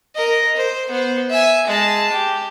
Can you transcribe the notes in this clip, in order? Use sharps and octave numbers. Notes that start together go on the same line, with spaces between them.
A#4 D#5
C5
B3 C5
E5 G#5
G#3 A5
G4